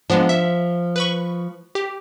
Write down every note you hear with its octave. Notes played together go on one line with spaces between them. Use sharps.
F3 G#3 B3 D4
E5
B4 B5 C#6
G4